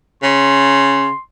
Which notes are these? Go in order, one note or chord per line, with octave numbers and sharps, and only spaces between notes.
C#3 C6